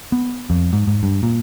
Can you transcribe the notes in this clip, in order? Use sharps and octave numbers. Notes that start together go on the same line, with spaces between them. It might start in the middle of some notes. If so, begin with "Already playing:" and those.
B3
F2
G#2
G#2
G2
A#2